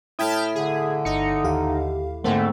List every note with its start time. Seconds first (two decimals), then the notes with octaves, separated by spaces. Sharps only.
0.19 A2 E4 G5 A5 D#6 F6 G#6 B6
0.55 D3 G#4
1.05 G1 D#4 C#7
1.44 D#2 G4 F5
2.24 G#2 D3 A3 A#3 C4